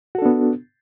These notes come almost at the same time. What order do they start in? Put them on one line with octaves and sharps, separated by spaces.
F#4 A4 D4 B3